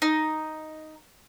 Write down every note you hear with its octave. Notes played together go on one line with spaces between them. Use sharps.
D#4